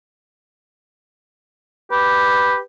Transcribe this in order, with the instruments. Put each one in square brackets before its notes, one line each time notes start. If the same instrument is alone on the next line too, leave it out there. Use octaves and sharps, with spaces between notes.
[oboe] G4 [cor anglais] B4